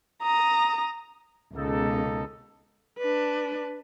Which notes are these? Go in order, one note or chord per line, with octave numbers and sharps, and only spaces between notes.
A#5 D#6
C#2 B2 A#3 D#4 A4
D4 B4